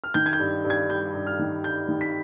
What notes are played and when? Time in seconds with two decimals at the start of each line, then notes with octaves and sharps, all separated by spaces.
0.04 F6
0.14 D#3 G6
0.26 G#6
0.33 G6
0.39 G2
0.65 G2
0.70 G#6
0.90 G3 G6
1.14 G2
1.27 F6
1.39 D#3
1.64 G2 G6
1.88 D#3
2.01 B6